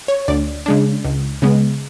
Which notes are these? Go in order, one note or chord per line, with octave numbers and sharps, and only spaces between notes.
C#5
D2 D5
C#3 G#3 D4
C#2
C#3 G#3 B3